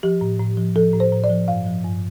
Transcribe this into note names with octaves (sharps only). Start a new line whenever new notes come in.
F3 G4
A2
A2
F3
F3 A4
A2
C5
A2
D5
F3
G2 F5
F3
G2